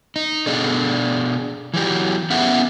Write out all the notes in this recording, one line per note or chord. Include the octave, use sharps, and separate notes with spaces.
D#4
B2 D4 G#4 A4 D5
E3 F#3 G4
B3 C#4 G4 G#4 E5 F#5